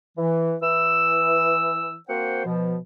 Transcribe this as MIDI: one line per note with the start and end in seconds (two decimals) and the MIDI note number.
0.17 0.55 52
0.62 1.95 52
0.62 1.95 88
2.08 2.42 58
2.08 2.42 60
2.08 2.42 66
2.08 2.42 72
2.08 2.42 78
2.08 2.42 79
2.45 2.76 47
2.45 2.76 53